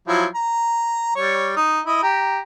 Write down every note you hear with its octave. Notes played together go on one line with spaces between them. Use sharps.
F3 F#3 E4
A#5
G3 C#5
D#4
E4 D#5
G4 A#5